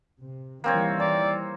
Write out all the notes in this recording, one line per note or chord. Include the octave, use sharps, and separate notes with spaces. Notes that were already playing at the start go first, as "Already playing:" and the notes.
C3
D#3 E3 G3 A#3 C4 C#5
D5 A#5